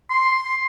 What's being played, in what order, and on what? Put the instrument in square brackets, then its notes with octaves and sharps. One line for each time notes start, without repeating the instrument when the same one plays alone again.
[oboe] C6